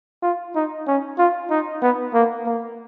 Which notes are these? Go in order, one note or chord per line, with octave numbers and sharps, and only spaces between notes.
F4
D#4
C#4
F4
D#4
B3
A#3
A#3